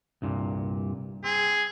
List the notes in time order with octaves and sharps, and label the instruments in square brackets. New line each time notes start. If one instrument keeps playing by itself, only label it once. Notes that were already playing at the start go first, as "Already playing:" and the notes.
[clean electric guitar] C2 G2 A#2
[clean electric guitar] C4 [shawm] G#4